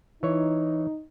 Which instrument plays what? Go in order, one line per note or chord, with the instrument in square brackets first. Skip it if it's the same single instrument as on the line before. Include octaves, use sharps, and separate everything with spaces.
[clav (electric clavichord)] E3 C#5 [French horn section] D#4